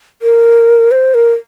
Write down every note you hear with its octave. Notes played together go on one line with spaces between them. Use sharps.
A#4
C5
A#4